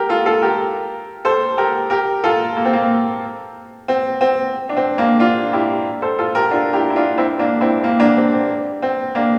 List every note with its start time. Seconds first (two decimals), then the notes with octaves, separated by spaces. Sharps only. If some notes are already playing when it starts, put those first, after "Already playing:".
Already playing: G4 A#4
0.09 F4 A4
0.26 F4 A4
0.42 G4 A#4
1.25 A4 C5
1.58 G4 A#4
1.90 G4 A#4
2.24 F4 A4
2.57 A#3
2.65 C4
2.73 A#3
3.88 C4
4.21 C4
4.69 D4
4.77 C4
4.98 A#3 D4
5.19 D4 F4
5.53 E4 G4
6.02 A4 C5
6.19 F4 A4
6.35 G4 A#4
6.51 D4 F4
6.73 E4 G4
6.90 E4
6.96 D4 F4
7.17 C4 E4
7.39 A#3 D4
7.61 C4 E4
7.83 A#3 D4
8.00 A#3 D4
8.16 C4
8.33 C4
8.82 C4
9.15 A#3 D4